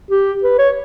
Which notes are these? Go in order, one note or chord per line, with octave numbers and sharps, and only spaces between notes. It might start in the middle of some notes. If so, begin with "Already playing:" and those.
G4
B4
C#5